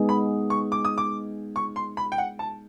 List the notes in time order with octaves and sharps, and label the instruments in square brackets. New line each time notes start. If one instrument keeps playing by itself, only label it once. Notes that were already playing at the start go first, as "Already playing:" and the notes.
Already playing: [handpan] G#3 B3 D#4 G#4
[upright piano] B5
C#6
D6
D#6
D6
C#6
C6
B5
G5
F#5
A5